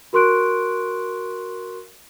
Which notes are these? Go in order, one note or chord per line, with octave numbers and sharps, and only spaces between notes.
F#4 A#4 C6 C#6 F#6 D7